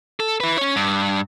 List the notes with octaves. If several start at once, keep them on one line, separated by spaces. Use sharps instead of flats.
A4
E4 B4
C#4 C#5
G2